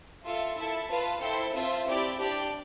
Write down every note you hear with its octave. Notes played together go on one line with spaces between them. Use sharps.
F4 A4 E5
E4 A4 E5 A5
F4 B4 F5 A5
E4 A4 C5 G5
C4 F4 C5 E5 A5
C4 E4 G4 D5
D4 G4 D5 G5